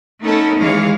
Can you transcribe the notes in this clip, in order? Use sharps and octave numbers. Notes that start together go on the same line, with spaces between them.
A3 B3 C#4 D#4 A4 A#4
D#2 E3 G#3 C#5 F5